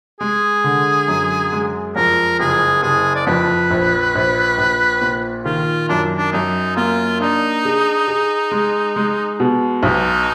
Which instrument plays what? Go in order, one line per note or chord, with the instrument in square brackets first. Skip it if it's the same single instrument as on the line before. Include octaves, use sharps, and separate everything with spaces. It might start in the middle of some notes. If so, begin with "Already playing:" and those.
[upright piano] G#3 [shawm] G#4
[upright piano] D3
F#2
G#3
[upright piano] F2 [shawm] A#4
[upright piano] F#1 [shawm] G#4
[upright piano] F#1 [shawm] G#4
[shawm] D5
[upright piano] F2 [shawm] B4
[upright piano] A#1
A#1
A#1
A#2
[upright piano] D#3 [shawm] F4
[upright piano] F#2 [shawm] D4
[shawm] D4
[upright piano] F#2 [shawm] D#4
[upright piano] A#3 [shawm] F4
[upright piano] D4 [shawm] D#4
[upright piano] G#4
G#4
G#3
G#3
B2
[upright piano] B1 [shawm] D#4